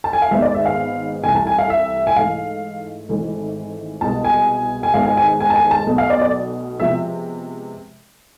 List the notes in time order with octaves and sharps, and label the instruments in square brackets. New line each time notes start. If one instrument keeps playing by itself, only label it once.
[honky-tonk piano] A5
G#5
F5
G#1 G#2 G#3 B3 E5
D5
E5
F5
C2 C3 E3 A3 G#5
A5
G#5
F5
E5
G#5
G#2 E3 A3 F5
G#1 G#2 E3 A3
C2 B2 G#3 B3 A5
G#5
G#5
G#1 G#2 G#3 B3 F5
G#5
G#5
G#5
A5
G#5
A5
B1 B2 A3
F5
D5
D5
C3 F3 G#3 B3 E5